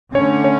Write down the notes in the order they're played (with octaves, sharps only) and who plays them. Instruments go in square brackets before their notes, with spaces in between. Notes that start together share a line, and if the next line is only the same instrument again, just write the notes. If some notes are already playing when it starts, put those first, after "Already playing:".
[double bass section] D3 A3 C#4 [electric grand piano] C#5
[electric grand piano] C#5